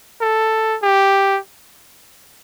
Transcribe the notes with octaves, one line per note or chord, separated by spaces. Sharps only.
A4
G4